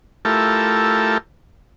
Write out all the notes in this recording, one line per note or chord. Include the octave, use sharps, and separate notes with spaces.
A3 E4 F4 G4 A4 A#4